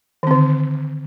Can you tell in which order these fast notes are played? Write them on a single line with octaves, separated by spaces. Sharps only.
D#3 C4 D3